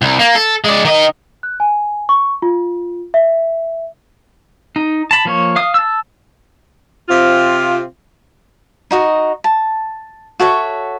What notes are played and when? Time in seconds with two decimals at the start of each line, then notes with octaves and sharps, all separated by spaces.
0.02 C2
0.19 A#3
0.35 A4
0.64 G#3 D5
0.85 D#3 D#5
1.43 F#6
1.60 G#5
2.09 C#6
2.42 F4
3.14 E5
4.76 D#4
5.11 A5 B5
5.25 F3 A#3 C#5
5.56 F5 D#6
5.74 A5 E6
7.09 C3 C4 F4
8.91 D#4 F#4 D#5
9.44 A5
10.40 F#4 A4 C#5 E5